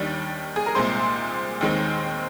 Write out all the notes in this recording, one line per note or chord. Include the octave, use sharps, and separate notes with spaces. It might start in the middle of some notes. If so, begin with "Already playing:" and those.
Already playing: D#2 D#3 G3 D4
G#4
A#4
C2 A#2 G#3 C4 C5
D#2 D#3 G#3 C4